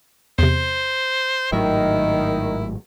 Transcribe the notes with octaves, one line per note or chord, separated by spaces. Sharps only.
E2 C3 C5
G#1 A2 D#3 F#3 E4